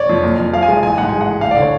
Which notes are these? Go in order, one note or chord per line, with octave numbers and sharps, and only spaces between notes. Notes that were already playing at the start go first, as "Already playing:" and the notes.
Already playing: C#5 D5
F2
F#1
F2
F3 F5
G#5
G#3 F5
A1 G#5
G#2 F#5
G#3 G#5
F#5
A1
D2 F5
D5
D3
C#5